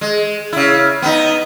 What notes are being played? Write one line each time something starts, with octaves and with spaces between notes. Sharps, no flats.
G#3
C#3 E4
B3 D#4